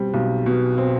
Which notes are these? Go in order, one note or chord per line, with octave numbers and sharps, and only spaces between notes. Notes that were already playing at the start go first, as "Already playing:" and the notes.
Already playing: B2 G3 C4
B1
B2
C4